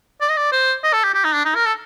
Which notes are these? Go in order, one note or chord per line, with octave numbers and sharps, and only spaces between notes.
D5
D#5
D5
C5
D#5
A4
G4
G4
D#4
D4
D#4
A#4
A4